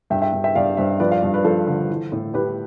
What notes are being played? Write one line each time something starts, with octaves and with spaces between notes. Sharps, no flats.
G2 E5 G5
E5 G5
G2
E5 G5
G2 D5 F5
G2 C5 E5
F3 B4 D5
D5 F5
G2
B4 D5
F3 A4 C5
D3
E3
A2
A2 G4 B4